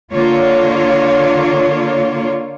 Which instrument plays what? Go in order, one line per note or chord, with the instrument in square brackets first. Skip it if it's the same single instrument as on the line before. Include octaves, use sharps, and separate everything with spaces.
[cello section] D3 A#3 F4 C#5